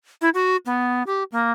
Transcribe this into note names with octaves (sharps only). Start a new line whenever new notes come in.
E4
F#4
B3
G4
A#3